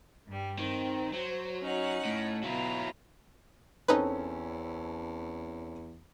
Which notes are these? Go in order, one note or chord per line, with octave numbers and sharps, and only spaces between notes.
G2 G3
D#3 C4
F#3 C5
C#4 D#4 F#5
A2
B2 F#3 E4 F4 A#5
E2 C4 C#4 D#4 A4 B4